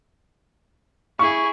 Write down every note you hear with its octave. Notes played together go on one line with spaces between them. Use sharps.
E4 G#4 C#6